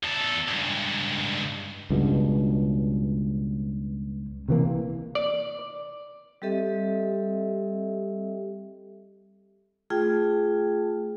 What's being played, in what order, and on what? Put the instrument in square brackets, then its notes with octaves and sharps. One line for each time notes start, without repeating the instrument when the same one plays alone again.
[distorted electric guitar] E2 A4
C#2 G2
[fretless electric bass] C#2 G2 B2
C3 E3 A#3
[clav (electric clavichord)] D5
[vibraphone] G3 C4 G4 A4 D#5 E5
A3 F4 G#4 G5